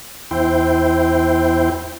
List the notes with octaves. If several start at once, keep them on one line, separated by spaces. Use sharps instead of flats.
E2 E4 C5 G5